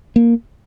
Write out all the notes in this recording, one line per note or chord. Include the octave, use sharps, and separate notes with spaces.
A#3